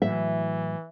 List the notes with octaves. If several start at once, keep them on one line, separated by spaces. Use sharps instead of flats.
A2 E3 F#3 E5